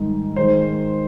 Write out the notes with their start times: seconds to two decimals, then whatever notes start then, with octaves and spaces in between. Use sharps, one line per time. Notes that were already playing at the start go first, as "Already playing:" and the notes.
Already playing: G#2 D#3 G3
0.36 D#3 G#3 C5